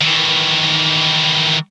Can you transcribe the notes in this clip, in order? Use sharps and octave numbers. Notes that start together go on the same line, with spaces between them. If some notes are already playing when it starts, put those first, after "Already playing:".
D#3 E3